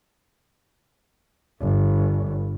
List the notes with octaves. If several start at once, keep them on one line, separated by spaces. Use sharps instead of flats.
G1